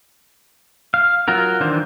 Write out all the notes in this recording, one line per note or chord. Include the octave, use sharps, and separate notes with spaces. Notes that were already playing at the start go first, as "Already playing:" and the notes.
F5
F#3 F4 F#4 A#4
D#3 E3 D4 C5